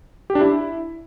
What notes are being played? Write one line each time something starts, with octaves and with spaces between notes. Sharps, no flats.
G4
D4
E4